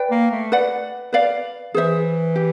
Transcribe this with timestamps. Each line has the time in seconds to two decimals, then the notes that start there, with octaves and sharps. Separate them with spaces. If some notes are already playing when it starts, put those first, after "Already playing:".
Already playing: B4 D5 G5
0.11 A#3
0.31 A3
0.52 B4 D5 F#5
1.13 B4 D5 F5
1.74 E3 G#4 C5 E5
2.36 G4